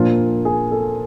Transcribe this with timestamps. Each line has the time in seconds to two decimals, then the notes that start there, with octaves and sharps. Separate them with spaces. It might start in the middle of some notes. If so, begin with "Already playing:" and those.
Already playing: A#2 F3 A#3 D4 F4
0.45 G#4
0.71 A4